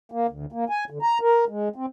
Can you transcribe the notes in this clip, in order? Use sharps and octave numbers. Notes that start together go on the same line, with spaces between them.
A#3
D2
A#3
G#5
D3
A#5
A#4
G#3
C4